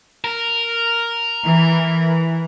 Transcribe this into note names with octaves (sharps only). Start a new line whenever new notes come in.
A#4
E3